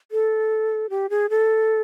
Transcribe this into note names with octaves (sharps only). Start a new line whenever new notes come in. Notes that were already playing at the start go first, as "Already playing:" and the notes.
A4
G4
G#4
A4